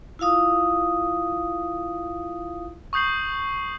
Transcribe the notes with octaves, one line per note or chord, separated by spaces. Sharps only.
E4 F4 F5 D#6
C#6 D#6 G6 C7 F#7